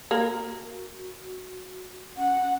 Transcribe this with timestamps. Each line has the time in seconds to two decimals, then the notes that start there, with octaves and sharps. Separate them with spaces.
0.11 A#3 F#4 A#4
2.17 C#4 F#5